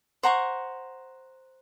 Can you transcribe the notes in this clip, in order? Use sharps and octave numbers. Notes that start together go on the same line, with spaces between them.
C5 F#5 A#5 C#6